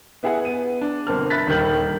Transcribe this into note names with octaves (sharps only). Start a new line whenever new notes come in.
B3 E4 G#4 E5 F#5
B3 D#7
D4
G1 B2 C4 A#4 A5 F6
E5 B5 F#6 A6 B6
D#1 G2 D#3 A#4 G6 F#7